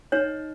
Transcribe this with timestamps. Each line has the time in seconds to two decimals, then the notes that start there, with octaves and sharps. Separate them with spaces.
0.12 D#4 C#5